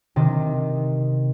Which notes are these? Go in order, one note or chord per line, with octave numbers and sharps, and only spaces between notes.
C3 D#3